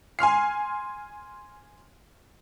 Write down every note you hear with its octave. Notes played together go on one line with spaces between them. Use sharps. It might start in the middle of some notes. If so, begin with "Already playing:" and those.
G#5 C6 F6 C7